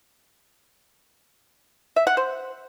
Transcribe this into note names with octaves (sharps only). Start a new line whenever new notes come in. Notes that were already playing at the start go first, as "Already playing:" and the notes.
E5
F#5
C5